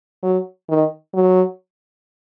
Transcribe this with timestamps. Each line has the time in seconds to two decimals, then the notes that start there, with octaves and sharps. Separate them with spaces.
0.23 F#3
0.69 D#3
1.14 F#3